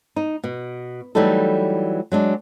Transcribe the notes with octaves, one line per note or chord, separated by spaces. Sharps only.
D#4
B2
E3 F#3 G3 A3 D#4 A4
F#3 G#3 D4